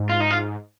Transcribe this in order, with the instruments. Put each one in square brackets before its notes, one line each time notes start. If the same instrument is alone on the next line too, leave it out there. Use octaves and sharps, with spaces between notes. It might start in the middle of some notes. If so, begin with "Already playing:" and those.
Already playing: [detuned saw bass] G#2
[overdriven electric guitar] F4
D#4
F4